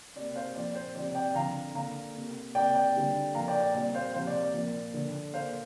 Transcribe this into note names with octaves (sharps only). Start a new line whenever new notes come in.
C3 A#3 D5
C5 F5
A#2 F3 C4 D5
C5
C3 F3 C4 D5
D5 G5
D3 F3 C4 F5 A#5
D3 A#3 F5 A#5
C3 A#3
C3 A#3 D5 G5
D5 G5
D3 G3 C4
A#2 F3 A#3 F5 A#5
D5 G5
D5
A#2 G3 C4 D5
C5 F5
C3 F3 A#3 C5 F5
D5
D5
A#2 F3 A#3
D3 F3 A#3
A#2 A#3 C5 F5